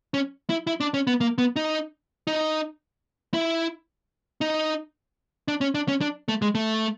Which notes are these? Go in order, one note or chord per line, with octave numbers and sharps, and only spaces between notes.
C#4
E4
E4
D4
C#4
B3
A#3
B3
D#4
D#4
E4
D#4
D4
C#4
D4
C#4
D4
A3
G#3
A3